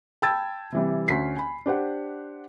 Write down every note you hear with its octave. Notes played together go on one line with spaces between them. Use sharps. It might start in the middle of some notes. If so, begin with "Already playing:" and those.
G5 A5 B5 E6 G#6 A6
C3 E3 G3
D2 C#4 B6 C7
G#5 B5
D4 G4 C5 F#5